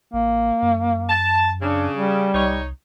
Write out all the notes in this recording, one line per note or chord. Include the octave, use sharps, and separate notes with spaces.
A1 A#3
F#2
A5
C#3 D4
G3
C2 D#4 C#5